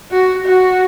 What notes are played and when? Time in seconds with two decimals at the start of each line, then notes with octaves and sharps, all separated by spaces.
0.11 F#4
0.46 F#4